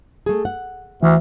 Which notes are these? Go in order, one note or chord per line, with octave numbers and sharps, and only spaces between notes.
A3 G#4
F#5
D2 E3